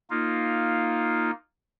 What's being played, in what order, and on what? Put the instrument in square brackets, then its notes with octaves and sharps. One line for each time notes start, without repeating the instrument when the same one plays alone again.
[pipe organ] A#3 D#4 F4